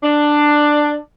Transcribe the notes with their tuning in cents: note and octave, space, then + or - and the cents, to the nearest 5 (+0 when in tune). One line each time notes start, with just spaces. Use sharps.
D4 +10